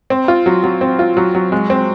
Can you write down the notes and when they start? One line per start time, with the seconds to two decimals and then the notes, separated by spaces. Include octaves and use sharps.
0.10 C4
0.28 F4
0.46 F#3
0.64 F#3
0.81 C4
0.99 F4
1.17 F#3
1.35 F#3
1.52 G#3
1.70 C4